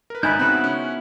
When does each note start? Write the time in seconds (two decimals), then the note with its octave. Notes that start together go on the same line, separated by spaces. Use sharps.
0.10 A#4 B4
0.23 G#1 D#4 E4 G#5 B5 F#6 G6
0.39 C#3 B3 C4 E4 F#4
0.64 C#4